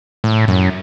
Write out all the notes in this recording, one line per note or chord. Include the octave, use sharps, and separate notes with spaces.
A2
F#2